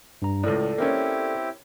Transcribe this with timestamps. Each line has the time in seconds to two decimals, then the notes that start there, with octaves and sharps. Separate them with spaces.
0.22 G2 A#5
0.43 C#2 A2 A4 D5
0.78 A#3 C4 C#4 E4 G4